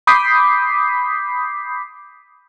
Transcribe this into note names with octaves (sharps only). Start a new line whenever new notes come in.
B5 D6 D#6 G6 B6 C7